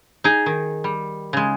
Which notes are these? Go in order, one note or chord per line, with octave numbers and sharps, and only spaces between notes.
D#4 G#4
D#3
G3
C#3 G#3